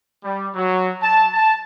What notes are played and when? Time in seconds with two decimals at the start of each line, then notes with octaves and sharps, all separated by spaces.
0.23 G3
0.55 F#3
1.01 A5
1.33 A5